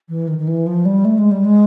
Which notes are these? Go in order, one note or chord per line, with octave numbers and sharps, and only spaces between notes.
E3
D#3
D#3
E3
F3
G3
A3
G#3
G3
G#3